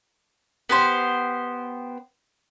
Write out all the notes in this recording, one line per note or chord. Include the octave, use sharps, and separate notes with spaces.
B3 G4 C5